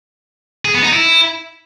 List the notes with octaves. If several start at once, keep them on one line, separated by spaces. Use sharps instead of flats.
G#4
B3
D#4
E4